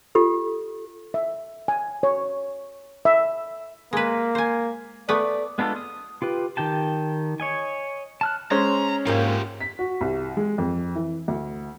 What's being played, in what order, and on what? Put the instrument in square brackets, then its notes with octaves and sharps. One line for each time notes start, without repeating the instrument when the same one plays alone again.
[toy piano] F4 G4 A4
[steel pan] E5
G#5
C#5
E5
[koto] G#3 B4 [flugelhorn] A#3
[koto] C5 G#5
[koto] A3 B3 B4 [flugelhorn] D5
[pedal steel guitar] G#3 B3 D4 F4 A4
D#6
F4 G4 B4
D#3 G4 G5 A5
C#5 D#5 G#5
A5 F6 F#6
[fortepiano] G#3 C#4 C5 [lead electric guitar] A#5
[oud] G#2 A#3 [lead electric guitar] F4 G4
[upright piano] B6
F#4
C2
G#3
F2
E3
D2